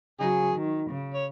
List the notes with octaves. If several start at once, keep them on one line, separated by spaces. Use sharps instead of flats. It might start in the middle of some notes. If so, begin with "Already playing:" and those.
C#3 F#3 D#4 G#4
D#3
C#3
C#5